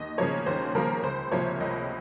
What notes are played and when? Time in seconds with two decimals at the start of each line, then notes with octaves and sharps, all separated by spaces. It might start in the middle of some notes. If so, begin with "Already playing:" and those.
Already playing: D#2 D#5
0.18 C#3 F3 A#3 C#5
0.46 D#2 C5
0.75 C#3 F3 A#3 A#4
1.03 C#2 C5
1.31 C3 F3 A#3 C#5
1.60 C#2 D#5